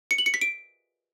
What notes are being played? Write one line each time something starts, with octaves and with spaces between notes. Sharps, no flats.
C#7
F#7
C#7
B6
D7